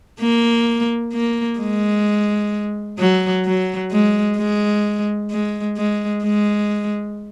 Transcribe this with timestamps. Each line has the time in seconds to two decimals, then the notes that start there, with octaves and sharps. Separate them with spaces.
0.20 A#3
1.13 A#3
1.59 G#3
2.99 F#3
3.45 F#3
3.91 G#3
4.38 G#3
5.31 G#3
5.77 G#3
6.24 G#3